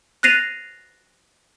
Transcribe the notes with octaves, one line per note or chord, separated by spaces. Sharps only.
F#6 A6 A#6 C7 D#7 F7